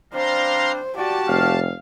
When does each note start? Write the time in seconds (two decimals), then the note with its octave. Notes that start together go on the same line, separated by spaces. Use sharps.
0.13 G3 C4 D4 C5 F5 A#5 C6
0.96 F#4 G4 D5 A5
1.28 F1 F5